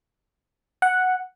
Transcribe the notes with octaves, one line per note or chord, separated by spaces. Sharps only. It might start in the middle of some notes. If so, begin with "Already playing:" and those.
F#5